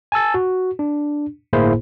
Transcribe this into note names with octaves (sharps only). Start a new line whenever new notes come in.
G#5 A5 E6 A6
F#4
D4
G1 A2 A#3 E4 G#4 C5